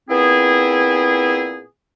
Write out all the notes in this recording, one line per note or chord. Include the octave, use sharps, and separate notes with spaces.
A#2 B3 C4 E4 G#4